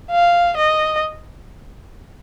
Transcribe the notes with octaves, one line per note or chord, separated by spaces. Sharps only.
F5
D#5